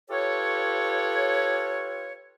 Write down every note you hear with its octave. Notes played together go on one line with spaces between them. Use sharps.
F4 G4 A4 B4 C#5